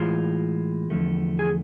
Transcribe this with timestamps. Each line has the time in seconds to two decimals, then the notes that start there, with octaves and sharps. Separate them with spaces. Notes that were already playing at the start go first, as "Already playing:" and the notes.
Already playing: A2 E3 G#3 F4 F5
0.90 E2 D3 F3 A3
1.39 G#4 G#5